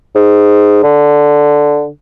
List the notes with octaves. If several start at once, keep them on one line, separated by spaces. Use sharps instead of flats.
G#2
D3